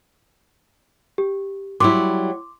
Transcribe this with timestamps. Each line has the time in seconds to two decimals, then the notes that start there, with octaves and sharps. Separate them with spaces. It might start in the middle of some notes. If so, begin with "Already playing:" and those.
1.18 G4
1.80 F#3 G3 E4 C6 D6